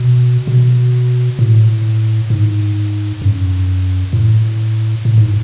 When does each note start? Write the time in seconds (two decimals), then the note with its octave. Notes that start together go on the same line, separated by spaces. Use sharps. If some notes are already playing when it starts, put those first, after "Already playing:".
Already playing: B2
0.47 B2
1.39 A2
2.30 G#2
3.22 F#2
4.13 A2
5.05 A2
5.18 G#2